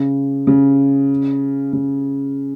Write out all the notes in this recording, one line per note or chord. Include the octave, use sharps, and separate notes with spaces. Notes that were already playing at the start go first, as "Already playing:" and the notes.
Already playing: C#3
C#3
C#3